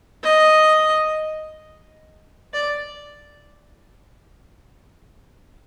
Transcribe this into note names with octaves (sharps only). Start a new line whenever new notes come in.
D#5
D5